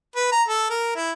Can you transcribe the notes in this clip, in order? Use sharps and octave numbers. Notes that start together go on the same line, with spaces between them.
B4
A#5
A4
A#4
E4